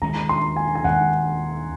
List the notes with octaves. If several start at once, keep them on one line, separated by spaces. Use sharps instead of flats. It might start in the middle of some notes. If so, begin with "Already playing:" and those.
D#2 D#3 G#3 C#4 A#5
C6
G#5
G#5
D#2 D#3 G#3 C#4 F#5